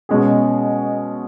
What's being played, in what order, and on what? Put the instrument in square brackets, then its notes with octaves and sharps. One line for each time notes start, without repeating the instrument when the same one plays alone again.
[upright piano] B2 G#3 C#4 G#4